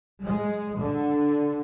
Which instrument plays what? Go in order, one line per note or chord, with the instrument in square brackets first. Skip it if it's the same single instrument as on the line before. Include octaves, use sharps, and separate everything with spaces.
[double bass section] G#3
D3